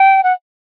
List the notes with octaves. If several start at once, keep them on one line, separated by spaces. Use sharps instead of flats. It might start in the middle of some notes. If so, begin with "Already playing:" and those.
Already playing: G5
F#5